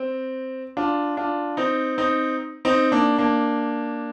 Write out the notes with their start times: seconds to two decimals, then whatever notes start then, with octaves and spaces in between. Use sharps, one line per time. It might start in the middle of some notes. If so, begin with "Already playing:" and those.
Already playing: C4
0.77 D4 F4
1.17 D4 F4
1.57 C4 D#4
1.98 C4 D#4
2.65 C4 D#4
2.92 A#3 D4
3.19 A#3 D4